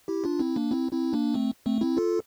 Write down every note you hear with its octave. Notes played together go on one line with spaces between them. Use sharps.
E4 G4
D4 F4
C4 E4
A#3 D4
C4 E4
C4 E4
A#3 D4
A3 C4
A3 C4
C4 E4
F4 A4